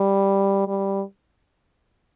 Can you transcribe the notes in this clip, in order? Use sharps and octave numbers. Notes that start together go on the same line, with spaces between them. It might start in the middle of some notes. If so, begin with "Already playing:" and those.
Already playing: G3
G3